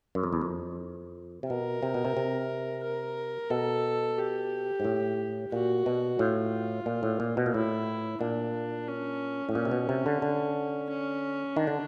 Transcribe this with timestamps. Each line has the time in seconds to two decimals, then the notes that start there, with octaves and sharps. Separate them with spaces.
0.15 F#2
0.23 F2
0.33 E2
0.41 F2
1.43 C3
1.49 B2 A#4
1.83 C3
1.94 B2
2.05 C3
2.17 C3
2.84 A#4
3.50 B2 A4
4.18 G4
4.80 G#2
4.85 A2
5.52 A#2 F#4
5.86 B2
6.19 A2 F4
6.86 A#2
7.03 A2
7.20 A#2
7.37 B2
7.46 A#2
7.54 A2 E4
8.21 A#2 D4
8.88 C#4
9.49 A2
9.55 A#2 C#4
9.65 C3
9.71 B2
9.89 C3
10.06 D3
10.22 D3
10.90 C#4
11.56 D#3 D4
11.67 D3